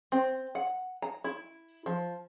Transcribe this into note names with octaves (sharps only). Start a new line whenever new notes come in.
C4
F#5
A#5
E4
F3